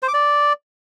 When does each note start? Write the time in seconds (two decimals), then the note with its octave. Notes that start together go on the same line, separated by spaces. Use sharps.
0.03 C5
0.08 D6
0.14 D5